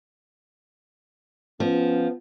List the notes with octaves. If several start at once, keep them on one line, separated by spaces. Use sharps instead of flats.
F3 B3 C#4